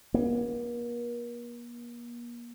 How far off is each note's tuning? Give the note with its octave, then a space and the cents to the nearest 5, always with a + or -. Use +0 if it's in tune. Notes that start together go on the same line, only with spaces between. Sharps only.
A#3 +40